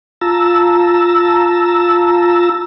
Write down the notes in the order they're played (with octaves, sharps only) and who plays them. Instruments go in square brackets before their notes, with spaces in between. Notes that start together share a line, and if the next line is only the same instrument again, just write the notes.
[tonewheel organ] F4 A5 A#5 E6